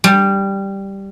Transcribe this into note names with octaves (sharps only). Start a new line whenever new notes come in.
G3